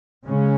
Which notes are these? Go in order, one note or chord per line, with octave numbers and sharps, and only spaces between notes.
C#3 G#3 C#4